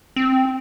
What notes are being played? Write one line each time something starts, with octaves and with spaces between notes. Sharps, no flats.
C4